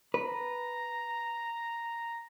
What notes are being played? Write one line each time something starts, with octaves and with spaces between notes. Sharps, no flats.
B4 A#5